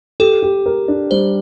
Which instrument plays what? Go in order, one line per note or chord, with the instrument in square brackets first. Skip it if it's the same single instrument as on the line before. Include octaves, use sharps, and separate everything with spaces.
[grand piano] G4 [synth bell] A4
[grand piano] G4
A#4
D4
[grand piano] G3 [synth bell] C5